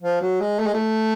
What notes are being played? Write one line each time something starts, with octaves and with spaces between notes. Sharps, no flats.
F3
F#3
G#3
A3
G#3
A3